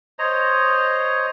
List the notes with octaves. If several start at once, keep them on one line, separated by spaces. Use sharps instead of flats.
C5 C#5 D#5 A#5